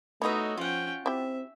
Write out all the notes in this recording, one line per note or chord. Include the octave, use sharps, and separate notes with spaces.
A3 B3 D#4 E4 F#4 C#5 D#5 E5
F3 C#4 F4 F#5 G5
C4 E4 G4 E5